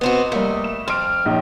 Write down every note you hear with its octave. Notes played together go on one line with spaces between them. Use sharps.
C3 B3 C4 F#4 D#5
G3 A3 A#3
E7
F2 C6 F6 D7
A#1 D#4 C#5